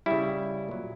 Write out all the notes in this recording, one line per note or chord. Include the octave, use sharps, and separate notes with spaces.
C#3 G3 E4
A#2 F#3